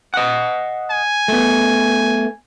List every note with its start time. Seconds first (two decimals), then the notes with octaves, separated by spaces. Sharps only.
0.14 D#5 F#5
0.91 G#5
1.28 A3 B3